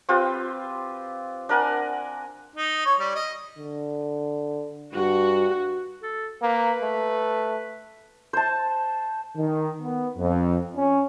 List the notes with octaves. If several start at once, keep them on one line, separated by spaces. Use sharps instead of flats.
C4 F4 G4 B4
D4 A#4 F#5 G#5
D#4
C#5
G3
D#5
D3
G2 F#4
A4
A#3 B4
A3
C5 A5
D#3
B3
F2
C#4